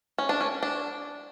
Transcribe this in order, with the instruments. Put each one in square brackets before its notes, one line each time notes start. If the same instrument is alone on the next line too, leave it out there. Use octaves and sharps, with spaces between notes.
[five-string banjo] C#4
D4
C#4
D4